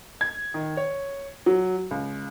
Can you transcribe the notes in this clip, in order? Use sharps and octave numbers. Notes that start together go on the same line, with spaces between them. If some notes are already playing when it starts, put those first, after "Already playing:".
G#6
D#3
C#5
F#3
C#2